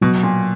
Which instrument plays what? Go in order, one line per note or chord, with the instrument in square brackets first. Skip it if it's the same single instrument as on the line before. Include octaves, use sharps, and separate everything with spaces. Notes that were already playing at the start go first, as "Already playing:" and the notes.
[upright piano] B2 [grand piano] F#3
[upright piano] A#2